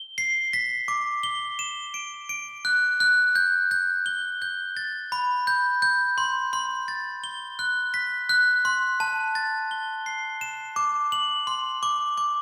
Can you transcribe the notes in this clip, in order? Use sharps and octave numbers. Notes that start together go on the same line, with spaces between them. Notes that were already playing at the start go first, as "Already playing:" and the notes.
Already playing: G7
C7
B6
D6
G7
E7
D7
D7
F#6
F#6
G6
G6
G7
G6
A6
B5
G6
G6
C6
C6
A6
G7
F#6
B6
F#6
C6
A5
A6
G7
C7
E7
D6
F#7
C6
D6
D6